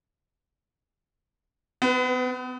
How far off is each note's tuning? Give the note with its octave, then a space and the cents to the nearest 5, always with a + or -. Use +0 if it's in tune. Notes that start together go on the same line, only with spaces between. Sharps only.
B3 +35 B4 +5